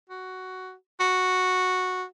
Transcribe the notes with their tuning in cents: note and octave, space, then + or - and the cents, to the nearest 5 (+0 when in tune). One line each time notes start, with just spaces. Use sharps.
F#4 +10
F#4 -5